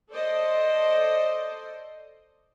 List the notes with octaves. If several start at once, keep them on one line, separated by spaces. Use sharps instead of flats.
A4 C5 D5 D#5